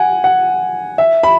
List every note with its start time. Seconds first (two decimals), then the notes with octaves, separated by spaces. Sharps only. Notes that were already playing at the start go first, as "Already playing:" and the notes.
Already playing: F#5 G#5
0.24 F#5
0.98 E5
1.23 B5